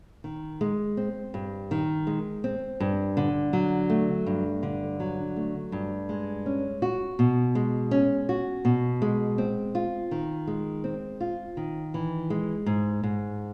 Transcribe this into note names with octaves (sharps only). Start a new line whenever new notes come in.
D#3
G#3
C4
G2
D#3
G#3
C4
G2
D3
F#3
A3
G2
D3
F#3
A3
G2
G#3
C#4
F#4
B2
G#3
C#4
F#4
B2
G#3
C4
F4
D#3
G#3
C4
F4
D#3
E3
G#3
G#2
G#2